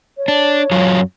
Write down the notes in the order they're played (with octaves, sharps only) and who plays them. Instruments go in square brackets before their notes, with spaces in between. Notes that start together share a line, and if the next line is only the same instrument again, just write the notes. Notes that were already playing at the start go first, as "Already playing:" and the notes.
[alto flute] C#5
[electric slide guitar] D4
F#2 F#3 F4